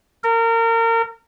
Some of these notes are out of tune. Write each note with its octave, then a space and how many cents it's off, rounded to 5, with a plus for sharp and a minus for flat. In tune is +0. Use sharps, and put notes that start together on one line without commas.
A#4 -30